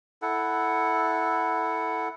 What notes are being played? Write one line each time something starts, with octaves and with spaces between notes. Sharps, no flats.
E4 A4 F#5